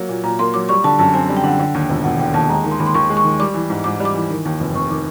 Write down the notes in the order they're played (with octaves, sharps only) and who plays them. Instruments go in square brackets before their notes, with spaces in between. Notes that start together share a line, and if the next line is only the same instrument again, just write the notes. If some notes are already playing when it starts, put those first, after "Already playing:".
Already playing: [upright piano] F#3 A#3
A#2
[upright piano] A#2 [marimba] A#5
[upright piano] A#3 [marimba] C6
[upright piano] F#3 [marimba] D6
[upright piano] G3 [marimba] C#6
[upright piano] D3 [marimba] A5
[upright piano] F#2 [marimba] A5
[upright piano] C4 [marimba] G#5
[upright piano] G3
[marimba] G5
[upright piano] D3 [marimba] F#5
[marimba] G5
[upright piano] D3
D#2
E1
[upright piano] E1 [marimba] F#5
[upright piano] D3 [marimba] G5
[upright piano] D#2 [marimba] A5
[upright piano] G#3 [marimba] A#5
[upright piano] D#3
[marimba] C6
[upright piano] D#2 [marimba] B5
[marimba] C6
[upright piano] D#2 [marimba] C#6
[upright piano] G#3
[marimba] C#6
[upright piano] D#3
[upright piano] G3 [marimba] D6
[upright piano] E3
G#2
[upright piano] G#2 [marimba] D6
[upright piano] G3
[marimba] D6
[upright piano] E3
D#3
D#2
F1
[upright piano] F1 [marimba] C#6
[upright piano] D#3 [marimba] D6